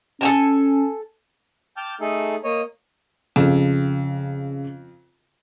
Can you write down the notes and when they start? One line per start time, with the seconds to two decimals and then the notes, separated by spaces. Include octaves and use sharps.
0.21 C#4 A4 G#5 A5
1.77 G5 A5 D6 F6 G6
2.01 A3 D#4 G#4 A4
2.44 A#3 C#5 D#5
3.36 F2 C#3